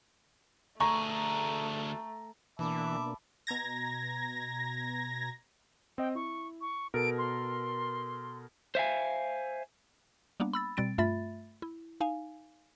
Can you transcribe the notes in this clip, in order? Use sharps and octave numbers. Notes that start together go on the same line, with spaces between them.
D2 A3 G#4 A#5 C#6
B2 E3 A#3 D4 E5 A5 B5 D6
B2 A#5 G#6 A#6
C4 D#5 G5
E4 C#6
C#6
B2 A4 A#4 D7
C6
C5 E5 F5 G#5
G3 A#3 B3 D4
B5 E6 A6
B2 G3 C4 A6 D7
G2 A3 F4 E5 B5 A6
E4
D#4 F5 G#5